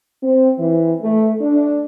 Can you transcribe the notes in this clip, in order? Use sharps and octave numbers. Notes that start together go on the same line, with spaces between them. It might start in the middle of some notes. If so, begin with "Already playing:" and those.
C4
E3
A3
D4